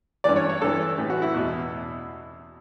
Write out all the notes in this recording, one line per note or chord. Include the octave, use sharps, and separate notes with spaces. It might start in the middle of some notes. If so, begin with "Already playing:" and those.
G2 E3 D5
C#5
C#5
G2 E3 A4
A2 E3
F#4
E4
E2 B2